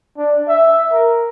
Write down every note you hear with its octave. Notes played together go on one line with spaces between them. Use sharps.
D4
E5
A#4